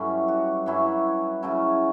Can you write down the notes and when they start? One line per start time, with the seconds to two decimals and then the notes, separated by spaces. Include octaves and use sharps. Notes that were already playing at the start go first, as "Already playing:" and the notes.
Already playing: G2 F#3 C#4 E4 A4
0.28 F#4
0.66 G2 F#3 C#4 E4 F#4
1.42 C#3 F#3 C#4 E4